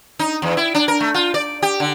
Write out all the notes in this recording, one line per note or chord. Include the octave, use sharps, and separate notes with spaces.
D#4
E2
E4
D4
A#4
A3
F4
D5
G4
D3